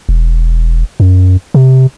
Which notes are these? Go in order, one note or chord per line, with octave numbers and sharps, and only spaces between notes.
E1
F#2
C3